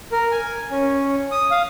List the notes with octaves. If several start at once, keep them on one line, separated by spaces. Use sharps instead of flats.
A#4
G#5
C#4
D#6
F5